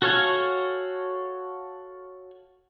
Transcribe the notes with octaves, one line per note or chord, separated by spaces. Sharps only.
F#4 A4 C#5 F5 G#5